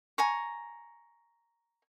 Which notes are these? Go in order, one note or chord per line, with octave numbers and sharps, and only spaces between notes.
G#5 A#5 C#6